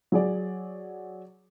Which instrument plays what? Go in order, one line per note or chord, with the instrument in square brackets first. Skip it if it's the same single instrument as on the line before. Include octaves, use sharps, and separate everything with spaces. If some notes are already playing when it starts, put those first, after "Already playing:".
[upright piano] F#3 G#4 D5